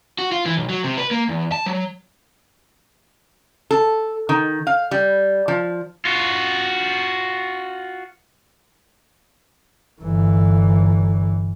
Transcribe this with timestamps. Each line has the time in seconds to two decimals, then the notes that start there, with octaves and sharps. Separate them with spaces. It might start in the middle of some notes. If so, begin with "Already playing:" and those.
0.19 F#4
0.32 F4
0.46 E3
0.57 B1
0.69 F#3
0.84 C3
0.98 B4
1.11 A#3
1.29 E2
1.52 A5
1.66 F#3
3.71 A4
4.29 D#3
4.67 F5
4.91 G3
5.48 F3
6.05 F4 F#4
10.01 G1 E3